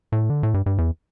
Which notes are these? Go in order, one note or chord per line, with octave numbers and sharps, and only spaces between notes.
A2
D3
A2
G2
G2
E2